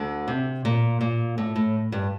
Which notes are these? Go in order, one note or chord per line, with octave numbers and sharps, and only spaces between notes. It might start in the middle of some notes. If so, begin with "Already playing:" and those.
Already playing: D2 D3
C3
A#2
A#2
A2
A2
G2